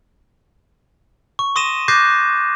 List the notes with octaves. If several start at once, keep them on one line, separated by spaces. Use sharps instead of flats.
C#6
C6 D#6 A#6 D#7 E7
D6 F#6 G6 A6 A#6 C7